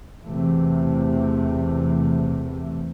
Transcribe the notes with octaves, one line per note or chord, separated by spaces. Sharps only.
E2 C3 E3 A3